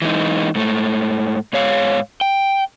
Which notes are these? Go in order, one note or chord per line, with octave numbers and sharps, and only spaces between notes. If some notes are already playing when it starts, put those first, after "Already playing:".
E3 G#3 D#4
G#2 A3
G#2 C#5 F5
G5